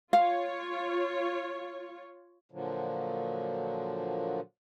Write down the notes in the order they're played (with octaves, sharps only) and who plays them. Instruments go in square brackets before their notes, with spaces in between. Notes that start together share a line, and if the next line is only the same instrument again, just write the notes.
[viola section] F4 C#5 [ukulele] F5
[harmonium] A#2 D3 F3 F#3